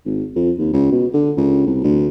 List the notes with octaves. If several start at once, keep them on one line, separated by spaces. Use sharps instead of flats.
G#1
F2
D#2
C#2
B2
D3
C#2
C2
D2